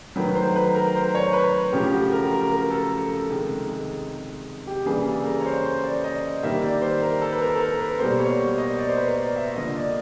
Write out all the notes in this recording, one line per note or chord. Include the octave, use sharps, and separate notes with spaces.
D#3 F#3 A3 B4
C5
B4
A#4
C5
C#5
B4
C#3 F3 A3 G4
G4
F#4
G4
A#4
A#4
A#4
A#4
A4
A4
C3 D#3 G#3
G#4
G4
C#3 E3 G3 A#3 G#4
A4
A#4
C#5
C5
C5
D5
D#5
D#3 G3 A#3 E5
D5
C5
A#4
A4
B4
A#4
A4
A#4
B4
B2 G3 A#3 C5
C#5
D#5
D5
C5
B4
A#4
D5
E5
D3 F3 A#3 D#5
D5